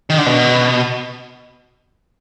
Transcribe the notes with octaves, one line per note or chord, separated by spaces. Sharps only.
D#3
D3
B2